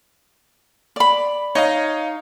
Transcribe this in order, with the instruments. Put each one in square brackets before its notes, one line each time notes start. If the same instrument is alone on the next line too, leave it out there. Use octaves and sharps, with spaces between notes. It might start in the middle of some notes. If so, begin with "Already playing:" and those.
[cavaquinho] D5 B5
[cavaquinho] D#4 [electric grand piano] C#5 D#5 F5